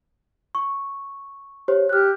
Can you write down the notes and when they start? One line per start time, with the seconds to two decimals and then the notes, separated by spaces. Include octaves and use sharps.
0.55 C#6
1.68 G4 C5 C#5
1.89 G4 F6 F#6